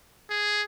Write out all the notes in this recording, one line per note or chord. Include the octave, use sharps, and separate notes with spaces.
G#4